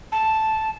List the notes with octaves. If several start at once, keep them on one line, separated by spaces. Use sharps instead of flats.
A5